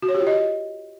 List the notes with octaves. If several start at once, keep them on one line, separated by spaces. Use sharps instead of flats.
F#4
C#5
G4
F4
D#5